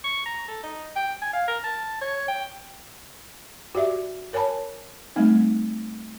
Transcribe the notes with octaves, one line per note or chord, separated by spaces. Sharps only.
C#6
A#5
A4
D#4
G5
G#5
F5
A#4
A5
C#5
G5
F#4 G4 D5 E5
A#4 C#5 G#5 A5 B5
G3 A3 C4 D#4